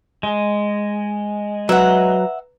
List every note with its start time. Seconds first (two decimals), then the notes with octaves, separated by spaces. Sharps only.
0.23 G#3
1.69 F#3 B4 E5 F#5 A#5